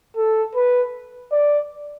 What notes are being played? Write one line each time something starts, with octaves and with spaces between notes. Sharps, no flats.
A4
B4
D5